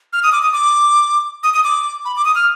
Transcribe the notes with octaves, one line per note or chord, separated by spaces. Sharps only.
F6
D#6
D6
D#6
D6
D#6
D#6
D6
B5
D6
D#6
F6